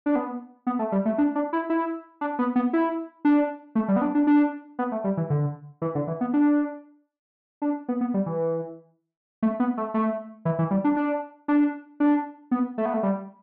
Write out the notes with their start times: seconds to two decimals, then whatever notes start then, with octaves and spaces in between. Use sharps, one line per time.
0.06 D4
0.16 B3
0.67 B3
0.79 A3
0.92 G3
1.05 A3
1.18 D4
1.35 D4
1.53 E4
1.70 E4
2.21 D4
2.39 B3
2.56 B3
2.73 E4
3.25 D4
3.75 A3
3.88 G3
3.96 B3
4.02 D4
4.15 D4
4.27 D4
4.79 B3
4.92 A3
5.04 G3
5.17 E3
5.30 D3
5.82 E3
5.95 D3
6.07 E3
6.21 B3
6.34 D4
7.62 D4
7.89 B3
8.01 B3
8.14 G3
8.26 E3
9.43 A3
9.60 B3
9.77 A3
9.94 A3
10.45 E3
10.59 E3
10.71 G3
10.84 D4
10.96 D4
11.48 D4
12.00 D4
12.51 B3
12.78 A3
12.86 B3
12.94 A3
13.03 G3